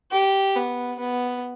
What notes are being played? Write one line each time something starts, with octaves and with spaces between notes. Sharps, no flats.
G4
B3
B3